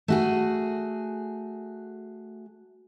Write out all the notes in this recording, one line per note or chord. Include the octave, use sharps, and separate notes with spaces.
A3 F#4 G#4